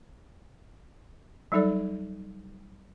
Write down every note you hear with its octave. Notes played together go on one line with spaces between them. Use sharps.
F#3 G3 D#4 A4 D5